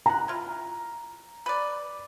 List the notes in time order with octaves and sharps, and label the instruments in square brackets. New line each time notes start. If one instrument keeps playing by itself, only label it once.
[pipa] B2 D#3 F#5 [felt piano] A#5
[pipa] E4 F4
B4 D5